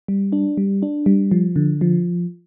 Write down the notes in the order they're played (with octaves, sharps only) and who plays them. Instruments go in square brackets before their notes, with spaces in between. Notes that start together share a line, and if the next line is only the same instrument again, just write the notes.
[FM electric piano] G3
D4
G3
D4
G3
F3
D3
F3